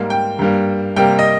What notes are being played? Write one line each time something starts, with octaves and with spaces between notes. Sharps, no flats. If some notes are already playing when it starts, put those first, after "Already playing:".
Already playing: G#2 G3 A#3
G5
G2 G3 A#3
C3 G3 A#3 G5
D#5